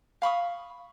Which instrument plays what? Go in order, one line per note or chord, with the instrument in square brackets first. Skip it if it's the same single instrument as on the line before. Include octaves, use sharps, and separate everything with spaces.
[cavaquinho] F5 B5 C#6 D#6